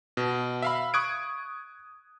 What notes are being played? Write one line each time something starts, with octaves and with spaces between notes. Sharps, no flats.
B2
E5 F5 B5
C#6 D#6 F#6 G#6 D7